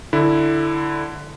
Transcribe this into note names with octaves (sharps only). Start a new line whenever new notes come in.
D3 E4